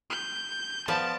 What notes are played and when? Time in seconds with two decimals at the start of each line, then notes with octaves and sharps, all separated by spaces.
0.10 G6
0.88 F3 B3 D5 A5